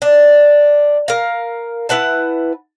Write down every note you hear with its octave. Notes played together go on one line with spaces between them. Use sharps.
D4
A#4 F5
E4 B4 F#5 A5